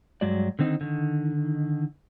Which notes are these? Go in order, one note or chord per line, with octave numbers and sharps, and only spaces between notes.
G2 F#3 G#3 F#4 D5
D3 D#3 C4 D#4
D3 D#3